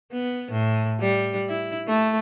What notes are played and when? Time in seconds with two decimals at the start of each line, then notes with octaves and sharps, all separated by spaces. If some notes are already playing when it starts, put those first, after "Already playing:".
0.12 B3
0.52 A2
1.00 G3
1.49 E4
1.87 A3